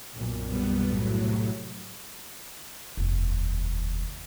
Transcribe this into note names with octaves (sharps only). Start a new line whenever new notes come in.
B1 F#2 A#2
G3 B3
A2 F#3
C3
F1 D#2